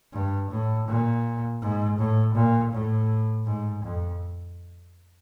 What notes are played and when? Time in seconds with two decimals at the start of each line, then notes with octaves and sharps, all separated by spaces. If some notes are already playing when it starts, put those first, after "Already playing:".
0.13 G2
0.51 A2
0.88 A#2
1.62 G#2
1.98 A2
2.35 A#2
2.73 A2
3.46 G#2
3.84 F2